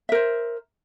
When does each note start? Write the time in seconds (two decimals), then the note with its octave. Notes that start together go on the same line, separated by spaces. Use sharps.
0.09 E5
0.12 A#4
0.15 C5